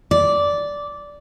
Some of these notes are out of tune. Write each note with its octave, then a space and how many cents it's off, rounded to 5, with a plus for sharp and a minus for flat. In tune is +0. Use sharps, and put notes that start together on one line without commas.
D5 -10